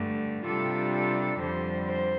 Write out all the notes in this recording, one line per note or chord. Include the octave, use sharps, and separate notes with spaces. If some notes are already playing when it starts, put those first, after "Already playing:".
Already playing: G2 D3 A3
C3 G3 D4 F4 A4
A4
F2 D3 G3 C5
C5